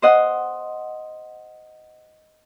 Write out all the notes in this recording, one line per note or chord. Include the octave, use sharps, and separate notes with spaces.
C5 D#5 F#5